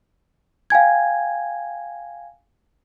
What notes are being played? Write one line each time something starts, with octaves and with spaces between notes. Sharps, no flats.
F5 G5 G#5 G#6